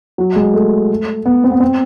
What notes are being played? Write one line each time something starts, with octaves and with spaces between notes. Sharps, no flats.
F#3
G#3
A3
B3
C4
B3
C4